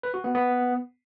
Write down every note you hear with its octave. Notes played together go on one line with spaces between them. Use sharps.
B4
F#4
B3
B3